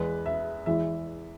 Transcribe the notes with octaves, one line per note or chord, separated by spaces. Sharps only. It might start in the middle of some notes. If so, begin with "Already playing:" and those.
Already playing: E2 E3 G#3 B4
E5
E2 E3 G#3 E5